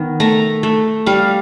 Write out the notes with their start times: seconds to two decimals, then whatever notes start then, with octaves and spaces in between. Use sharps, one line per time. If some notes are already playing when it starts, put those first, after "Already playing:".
Already playing: D#3 B3
0.20 A3 A#5
0.63 A3
1.06 G3 F5